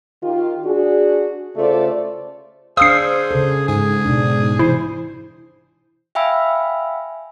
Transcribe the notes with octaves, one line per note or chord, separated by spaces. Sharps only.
D#3 F4 G4
D4 F#4 G#4
C#3 A3 F4 A4 C5 D5
D4 G#4 C5 F5 D#6 E6 C7
C#3 A4
G#2 G#4
B2 D4
C3 E3 E4 C5
E5 F5 G5 G#5 B5 E6